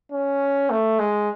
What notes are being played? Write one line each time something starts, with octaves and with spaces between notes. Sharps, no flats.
C#4
A3
G#3